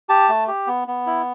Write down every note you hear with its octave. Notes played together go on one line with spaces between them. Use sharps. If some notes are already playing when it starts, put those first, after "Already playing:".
G4 A5
A3
G4
B3
B3
E4